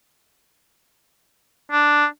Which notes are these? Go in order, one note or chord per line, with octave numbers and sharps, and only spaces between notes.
D4